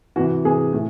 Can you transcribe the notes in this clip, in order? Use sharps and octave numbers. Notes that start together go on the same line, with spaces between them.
C3 E3 F#4
C3 E3 G#4
A2